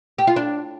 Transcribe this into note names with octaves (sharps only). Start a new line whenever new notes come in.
G4
F4
D4